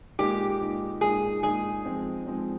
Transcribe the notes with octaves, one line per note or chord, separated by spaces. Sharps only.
A#2 G#3 D#4 G4
A#2 G#3 D#4
A#2 G#3 D#4 G#4
A#2 G#3 D#4 G#4
F3 G#3 C4 D#4
F3 G#3 C4 D#4